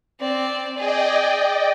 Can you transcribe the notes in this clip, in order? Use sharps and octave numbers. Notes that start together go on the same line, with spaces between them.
C4 D5
G#4 D5 D#5 G5